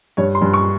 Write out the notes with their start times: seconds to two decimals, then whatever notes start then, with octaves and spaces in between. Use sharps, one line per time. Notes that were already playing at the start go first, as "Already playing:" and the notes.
0.17 G2 C#5
0.35 C6
0.41 G2
0.54 C#6